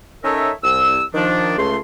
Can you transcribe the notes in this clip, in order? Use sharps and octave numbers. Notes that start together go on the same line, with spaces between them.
C#4 D#4 A4 A#4 C#5 E5
C2 E6
D#3 F3 D4
C#2 A3 C6